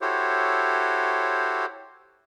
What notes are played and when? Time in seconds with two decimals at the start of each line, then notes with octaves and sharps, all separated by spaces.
0.01 E4 F#4 G4 A4 C5 C#5